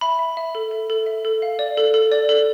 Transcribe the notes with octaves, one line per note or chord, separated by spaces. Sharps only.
E5 B5
E5
E5
A4
A4
A4
E5
A4
F5
D5
A4
A4
D5
A4